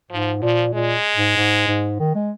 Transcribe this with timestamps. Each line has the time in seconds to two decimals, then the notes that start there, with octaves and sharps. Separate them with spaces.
0.11 G#2 F3
0.42 A#2 F3
0.73 A#2 G#3
1.16 G#2
1.37 G#2
1.67 G#2
1.99 D#3
2.15 G#3